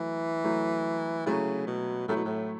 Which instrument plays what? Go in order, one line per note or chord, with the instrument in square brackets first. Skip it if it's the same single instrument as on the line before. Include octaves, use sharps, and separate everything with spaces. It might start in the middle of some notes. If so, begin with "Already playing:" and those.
Already playing: [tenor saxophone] E3 [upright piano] F#3 A3
[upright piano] F#3 A3 E4
[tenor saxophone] C#3 [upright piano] F#3 A3 E4
[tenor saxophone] B2
[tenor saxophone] A2 [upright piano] F#3 A3 E4
[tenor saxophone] B2
A2